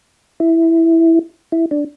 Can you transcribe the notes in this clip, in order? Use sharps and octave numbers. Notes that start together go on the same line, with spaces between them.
E4
E4
D4